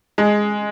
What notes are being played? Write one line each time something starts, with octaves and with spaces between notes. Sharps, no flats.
G#3